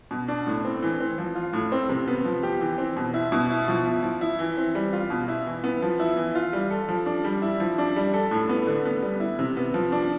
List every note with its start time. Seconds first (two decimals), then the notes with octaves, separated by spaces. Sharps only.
0.11 B2
0.28 D4
0.47 A2
0.65 C4
0.83 E3
1.00 C4
1.18 F3
1.35 F4
1.53 A2
1.72 C4
1.89 C3
2.08 B3
2.25 F3
2.43 G4
2.61 E3
2.78 C4
2.97 B2
3.14 E4
3.32 B2
3.50 E4
3.68 F3
3.86 E4
4.03 F3
4.21 E4
4.39 E3
4.57 C4
4.75 G3
4.93 F4
5.10 B2
5.28 E4
5.46 E3
5.64 B3
5.82 F3
6.00 E4
6.17 E3
6.35 F4
6.53 G3
6.71 A4
6.89 F3
7.06 D4
7.25 G3
7.42 E4
7.60 F3
7.78 D4
7.96 G3
8.14 A4
8.31 A2
8.49 B3
8.67 D3
8.85 B3
9.02 G3
9.20 E4
9.39 C3
9.57 B3
9.74 F3
9.92 D4